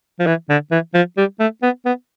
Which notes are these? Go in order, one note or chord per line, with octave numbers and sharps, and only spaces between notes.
F3
E3
D3
E3
F3
G3
A3
B3
B3